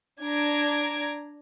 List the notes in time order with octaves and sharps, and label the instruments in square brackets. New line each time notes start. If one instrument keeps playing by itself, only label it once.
[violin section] D4 A#5 G#6 D7